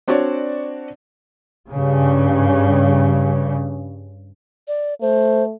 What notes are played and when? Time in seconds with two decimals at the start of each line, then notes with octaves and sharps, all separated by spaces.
0.08 C4 D4 F#4 C#5 D5
1.72 G2 C#3
4.68 D5
5.01 A3 C5